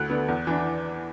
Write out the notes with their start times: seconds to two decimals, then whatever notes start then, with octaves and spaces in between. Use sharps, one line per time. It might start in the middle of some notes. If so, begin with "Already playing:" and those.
Already playing: D2 F#6
0.10 D3 B3
0.28 E2
0.47 E3 D4